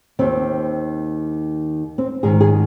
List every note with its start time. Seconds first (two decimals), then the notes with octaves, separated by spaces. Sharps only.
0.19 D#2 D#3 C4
1.98 C4
2.23 G#2 D#3 G#4
2.41 G#4